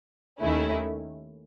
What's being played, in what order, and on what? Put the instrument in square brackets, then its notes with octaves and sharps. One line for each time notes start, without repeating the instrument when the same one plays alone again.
[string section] D#2 D#3 A3 C#4 E4